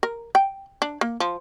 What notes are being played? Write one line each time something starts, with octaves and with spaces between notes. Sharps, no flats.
A#4
G5
D4
A#3
F3